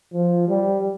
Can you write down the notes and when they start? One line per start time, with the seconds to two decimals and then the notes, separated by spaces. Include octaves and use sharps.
0.13 F3
0.48 G3